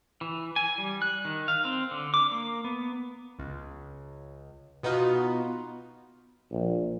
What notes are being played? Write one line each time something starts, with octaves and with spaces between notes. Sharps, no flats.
E3
G#5
G3
F#6
D#3
F5
C4
D3
D6
A#3
B3
C#2
B2 B3 D#4 F4 F#4
A#1